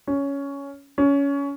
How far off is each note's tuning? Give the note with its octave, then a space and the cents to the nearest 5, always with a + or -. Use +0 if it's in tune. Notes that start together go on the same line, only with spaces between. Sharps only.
C#4 +10
C#4 +20